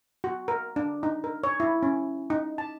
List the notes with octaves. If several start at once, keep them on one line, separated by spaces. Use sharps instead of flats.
F#4
A#4
D4
D#4
A#4
C#5
E4
C#4
D#4
A5